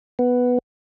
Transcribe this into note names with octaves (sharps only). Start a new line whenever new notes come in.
B3